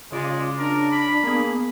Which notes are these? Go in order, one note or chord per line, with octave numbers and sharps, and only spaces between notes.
C#3 G#3 F4 D5
D4 A#4
B5
A#3 B3 G#4